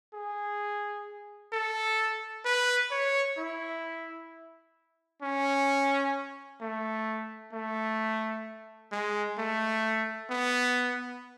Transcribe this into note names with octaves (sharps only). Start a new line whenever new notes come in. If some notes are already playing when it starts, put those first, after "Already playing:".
G#4
A4
B4
C#5
E4
C#4
A3
A3
G#3
A3
B3